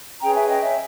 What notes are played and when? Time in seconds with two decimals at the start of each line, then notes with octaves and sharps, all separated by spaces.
0.20 C#4 G#4 B4 G5 A#5
0.34 E5 G#5
0.48 D#5 G5
0.62 C#5 E5